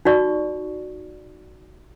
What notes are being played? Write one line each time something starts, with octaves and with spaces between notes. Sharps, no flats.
D#4 F#4 D5 C#6